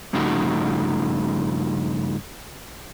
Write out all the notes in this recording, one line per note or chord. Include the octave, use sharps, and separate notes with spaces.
G2 C#3 F3 A3 D#4 F#4